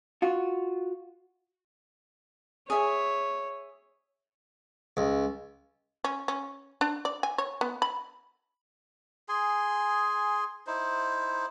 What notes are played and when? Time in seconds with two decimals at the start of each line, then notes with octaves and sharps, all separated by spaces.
0.22 F4 F#4
2.70 G#4 C#5 E5
4.97 C#2
6.04 C#4
6.28 C#4
6.81 D4
7.05 D5
7.23 G#5
7.38 C#5
7.61 B3
7.82 B5
9.29 G#4 G#5 C6
10.67 D#4 E4 C5